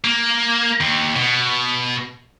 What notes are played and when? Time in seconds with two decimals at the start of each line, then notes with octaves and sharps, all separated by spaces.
0.04 A#3
0.80 D#2
1.16 B2